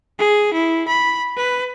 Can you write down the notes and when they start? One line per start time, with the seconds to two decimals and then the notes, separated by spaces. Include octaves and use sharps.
0.19 G#4
0.53 E4
0.88 B5
1.37 B4